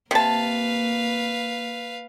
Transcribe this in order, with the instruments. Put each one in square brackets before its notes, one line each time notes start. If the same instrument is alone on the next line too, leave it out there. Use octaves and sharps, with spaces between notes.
[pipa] C3 A5 [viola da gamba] A#3 [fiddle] B4 F5